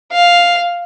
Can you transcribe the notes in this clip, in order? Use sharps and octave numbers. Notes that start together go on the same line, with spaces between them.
F5